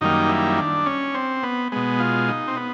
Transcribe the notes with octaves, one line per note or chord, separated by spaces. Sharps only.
F#2 D#3 G3 A#3 D#4
E4
D4
C#4
C4
B3
B2 G#3 B3
F4
D#4
C4
B3